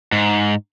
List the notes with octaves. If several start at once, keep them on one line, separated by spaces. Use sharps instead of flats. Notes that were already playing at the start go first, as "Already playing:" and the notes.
G#2